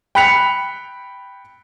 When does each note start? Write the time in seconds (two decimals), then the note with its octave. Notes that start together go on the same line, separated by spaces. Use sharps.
0.15 G5 B5 F#6 B6 C#7 F7